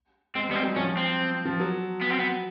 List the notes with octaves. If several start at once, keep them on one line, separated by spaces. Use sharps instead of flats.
G#3 C4
G3 B3
C4
F#3
F3 C#4
C4
F3
F#3
B3
C4
B3